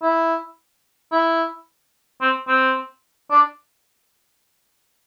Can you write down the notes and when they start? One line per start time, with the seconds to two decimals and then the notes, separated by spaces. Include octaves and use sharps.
0.02 E4
1.12 E4
2.22 C4
2.48 C4
3.31 D4